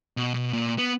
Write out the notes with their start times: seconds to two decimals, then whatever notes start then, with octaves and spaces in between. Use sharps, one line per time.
0.17 B2
0.34 B2
0.53 A#2
0.78 B3